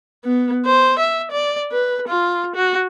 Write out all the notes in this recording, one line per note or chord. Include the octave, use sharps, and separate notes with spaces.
B3
C5
E5
D5
B4
F4
F#4